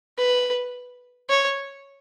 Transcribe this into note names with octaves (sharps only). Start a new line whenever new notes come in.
B4
C#5